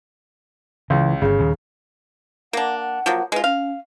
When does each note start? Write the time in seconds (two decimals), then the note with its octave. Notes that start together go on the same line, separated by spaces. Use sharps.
0.90 C#2 C#3 E3
1.22 G1 C#3
1.38 D#2 A#2
2.53 A#3 D4 F#5
2.80 F#5
3.06 F3 F#3 A#3
3.32 G#3 F4 B4
3.44 C#4 F5